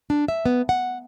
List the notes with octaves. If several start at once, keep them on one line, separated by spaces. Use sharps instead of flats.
D4
E5
B3
F#5